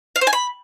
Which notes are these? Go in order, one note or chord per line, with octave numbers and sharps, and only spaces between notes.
F5
C5
G#5
B5